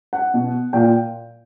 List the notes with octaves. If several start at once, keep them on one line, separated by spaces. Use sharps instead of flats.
F#5
B2
A#2 G5